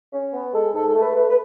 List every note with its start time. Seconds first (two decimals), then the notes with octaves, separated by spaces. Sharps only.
0.13 C#4
0.33 B3
0.54 G#3 A4
0.74 G#2 A4
0.89 A4
0.95 A3
1.02 B4
1.15 A3 B4
1.29 B4